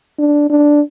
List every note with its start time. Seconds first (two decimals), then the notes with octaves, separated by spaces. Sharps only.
0.19 D4
0.49 D4